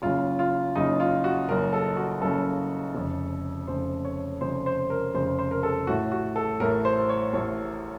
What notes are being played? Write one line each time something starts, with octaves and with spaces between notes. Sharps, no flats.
F#1 F#2 C#3 F4
F4
F#1 F#2 C#3 D#4
F4
F#4
F#1 F#2 C#3 A#4
A4
F#4
F#1 F#2 C#3 A4
F1 F2 C#3
F1 F2 C#3 C5
C#5
F1 F2 C#3 C5
C5
A#4
F1 F2 C#3 C5
C5
A#4
A4
A1 A2 F#4
F#4
A4
A1 A2 A#4
C5
C#5
A1 A2 C#5